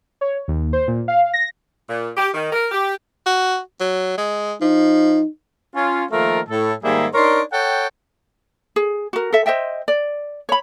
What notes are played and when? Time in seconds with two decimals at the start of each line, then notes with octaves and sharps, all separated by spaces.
0.21 C#5
0.48 D#2
0.73 C5
0.88 A#2
1.08 F5
1.33 A#6
1.89 A#2
2.17 G4
2.33 D#3
2.52 A#4
2.71 G4
3.26 F#4
3.80 F#3
4.18 G#3
4.62 F3 D#4
5.75 C#4 F4
6.12 D#3 F3 A3 A#3 F4 A#4
6.49 A2 A4
6.84 G#2 D#3 G3 A#3 G#4 E5
7.14 D4 D#4 A#4 C#5 C6
7.52 A4 C#5 F#5 G5
8.76 G#4
9.13 F#4 A#4
9.33 A4 E5
9.46 C5 D#5 E5 G5
9.88 D5
10.49 C#5 B5